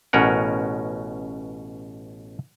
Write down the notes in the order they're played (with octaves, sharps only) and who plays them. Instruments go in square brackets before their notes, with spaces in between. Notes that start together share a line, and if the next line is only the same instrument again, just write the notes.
[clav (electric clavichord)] A1 B2 C#4 A#4 F#5